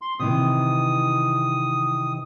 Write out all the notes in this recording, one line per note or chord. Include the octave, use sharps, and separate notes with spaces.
C6
C3 D#3 E3 D#6